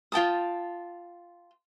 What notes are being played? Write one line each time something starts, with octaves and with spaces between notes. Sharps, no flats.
F4 G5 A5 D#6